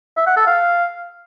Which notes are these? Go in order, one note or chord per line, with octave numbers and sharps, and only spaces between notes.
E5
F#5
A4
F5